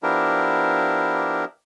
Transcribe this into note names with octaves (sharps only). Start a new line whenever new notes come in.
F3 B3 D4 E4 G4 A#4